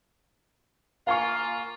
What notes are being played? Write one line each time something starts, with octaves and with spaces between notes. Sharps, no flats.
A#3 F4 F5 G#5 C#6